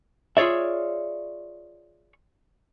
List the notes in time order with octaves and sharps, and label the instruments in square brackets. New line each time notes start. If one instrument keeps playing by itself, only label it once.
[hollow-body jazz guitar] F4 G#4 C#5 D5 E5